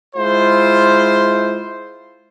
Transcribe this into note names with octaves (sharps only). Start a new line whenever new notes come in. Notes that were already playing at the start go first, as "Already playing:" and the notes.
G#3 E4 F4 C5